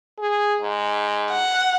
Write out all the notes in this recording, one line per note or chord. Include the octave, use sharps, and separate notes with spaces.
G#4
G#2
F#5